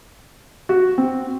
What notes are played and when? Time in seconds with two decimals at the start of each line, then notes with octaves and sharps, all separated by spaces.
0.69 F#4
0.98 C4